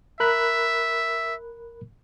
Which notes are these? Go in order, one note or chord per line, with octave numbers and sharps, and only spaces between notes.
A#4 E5 B5 F#6